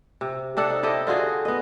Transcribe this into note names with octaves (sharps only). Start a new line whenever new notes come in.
C3
C3 D4 A4 F#5
D#4
E4 G4 A4 D#5
D3 F4 F#4 G#4
B3 D#5